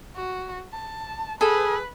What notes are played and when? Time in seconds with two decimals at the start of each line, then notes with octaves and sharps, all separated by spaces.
0.16 F#4
0.73 A5
1.41 G#4 A4 B4